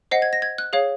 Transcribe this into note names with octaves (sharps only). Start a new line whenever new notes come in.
C5 D#5 F#5 C7
G#6
A#6
G#6
F#6
G#4 C#5 F5